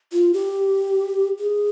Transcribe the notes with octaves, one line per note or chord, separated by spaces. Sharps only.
F4
G4
G#4